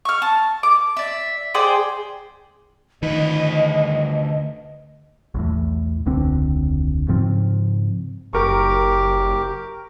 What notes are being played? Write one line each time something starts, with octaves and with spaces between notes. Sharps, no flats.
C#6 F6
A5
D6
D5 E5
G#4 C5 D5 G5
D2 D#3 B4 D#5
B1 E2 A2
E1 C#2 D3 C4
G#2 C#3 F3 C4
F#1 G4 A#4 C#6